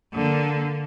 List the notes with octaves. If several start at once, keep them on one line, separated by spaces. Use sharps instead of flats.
D3 A#3